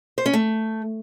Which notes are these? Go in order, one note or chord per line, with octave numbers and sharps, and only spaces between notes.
C5
C#4
A3